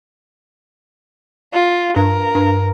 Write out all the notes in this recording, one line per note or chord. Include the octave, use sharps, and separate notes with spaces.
F4
G2 A#4
G2